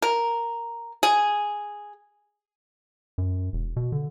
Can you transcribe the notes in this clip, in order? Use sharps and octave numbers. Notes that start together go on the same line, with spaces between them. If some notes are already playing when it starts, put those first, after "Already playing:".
A#4
G#4
F#2
E1
B2
D3